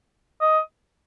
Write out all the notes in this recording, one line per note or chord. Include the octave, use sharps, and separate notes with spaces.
D#5